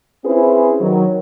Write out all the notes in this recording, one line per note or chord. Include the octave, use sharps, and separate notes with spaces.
C4 C#4 E4 G#4 B4 C5
D#3 F#3